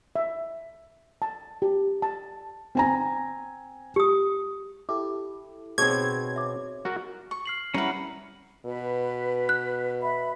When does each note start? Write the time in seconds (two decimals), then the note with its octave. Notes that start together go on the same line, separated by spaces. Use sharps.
0.16 E5
1.22 A5
1.62 G4
2.02 A5
2.75 C4 G#5 A#5
3.96 G4 D#6
4.89 E4 G4 A4 D6
5.78 B2 C4 D#4 G#4 C#5 G#6
6.36 E5 D6
6.85 F#4 A#4
7.31 C#6
7.46 F6 C7 F#7
7.74 G3 C#4 E4 A#4 B4 F#5
8.66 B2 B4
9.49 F#6
10.01 B4 E5 B5